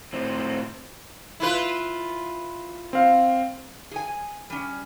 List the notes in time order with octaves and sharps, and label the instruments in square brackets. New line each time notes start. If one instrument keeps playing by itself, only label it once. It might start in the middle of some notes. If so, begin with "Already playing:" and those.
[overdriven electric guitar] A2 C4
[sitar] E4 F4 B4
[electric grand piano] C4 F5
[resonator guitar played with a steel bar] G#4 G#5
G3 C#4